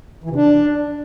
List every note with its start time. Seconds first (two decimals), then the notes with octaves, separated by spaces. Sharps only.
0.24 E3
0.30 C3
0.35 D4